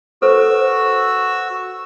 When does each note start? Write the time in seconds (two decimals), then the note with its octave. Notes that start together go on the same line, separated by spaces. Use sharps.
0.22 F#4 A4 B4 C5 E6